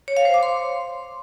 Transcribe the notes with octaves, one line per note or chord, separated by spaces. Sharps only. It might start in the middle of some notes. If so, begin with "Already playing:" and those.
C#5
F5
C5
D6
C6